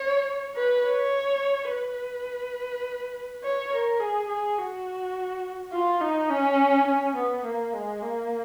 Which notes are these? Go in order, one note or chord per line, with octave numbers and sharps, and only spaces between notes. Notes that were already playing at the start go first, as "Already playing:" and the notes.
Already playing: C#5
B4
C#5
B4
C#5
A#4
G#4
G#4
F#4
F4
D#4
C#4
C#4
B3
A#3
G#3
A#3